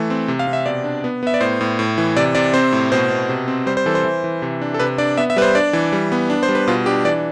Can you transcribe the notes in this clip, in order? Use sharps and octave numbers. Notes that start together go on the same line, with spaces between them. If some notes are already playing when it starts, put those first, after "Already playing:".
Already playing: E3 A3
C4
C3
F5
C3
E5
B2 D5
D4
B3
B3 E5
D5
A2 C5
A2
A2
E3
C3 D5
C3 D5
C4 C5
A2
B2 C5
B2
C3
C4
G3 C5
C5
E3 A4
C5
E3
E3
C3
D4
A4
C3 B4
D4 D5
B3 E5
E5
G3 B4
C5
D4 D5
E3
G3
B3
D4
C5
G3
B4
B2 F4
D4 G4
E3 D5